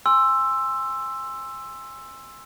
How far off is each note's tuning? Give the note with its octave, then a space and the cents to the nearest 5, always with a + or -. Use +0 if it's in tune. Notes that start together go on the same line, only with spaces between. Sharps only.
G#5 -25 C6 +10 E6 +10